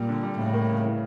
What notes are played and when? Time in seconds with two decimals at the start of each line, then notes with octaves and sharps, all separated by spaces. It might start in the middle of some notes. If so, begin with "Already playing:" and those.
Already playing: A#2 G3
0.09 D3
0.23 G3
0.38 A2 C#3
0.54 A#3
0.69 C#3
0.84 E3